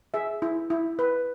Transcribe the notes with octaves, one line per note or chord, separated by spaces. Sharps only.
G#4 E5
E4
E4
B4